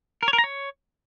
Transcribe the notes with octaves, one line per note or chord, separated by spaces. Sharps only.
A#4
C#5
A#4
A#5
C#5